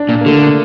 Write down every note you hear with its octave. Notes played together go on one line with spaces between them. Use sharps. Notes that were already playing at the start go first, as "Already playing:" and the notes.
Already playing: D4
A#2
A#3
D3 A3